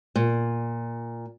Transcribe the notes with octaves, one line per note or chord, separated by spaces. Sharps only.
A#2